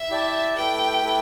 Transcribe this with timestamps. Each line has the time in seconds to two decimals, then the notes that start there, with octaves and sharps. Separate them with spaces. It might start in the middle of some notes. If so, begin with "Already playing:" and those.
Already playing: E5
0.09 E4 G4 D5 A5
0.56 A3 E4 G4 B4 G5
1.03 A3 E4 G4 B4